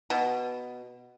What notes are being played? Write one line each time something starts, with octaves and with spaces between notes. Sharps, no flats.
B2